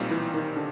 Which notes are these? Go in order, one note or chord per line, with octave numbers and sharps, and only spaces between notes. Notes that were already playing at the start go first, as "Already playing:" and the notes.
Already playing: B1 A#2 G3 C4 D#4
E3
D#3
D3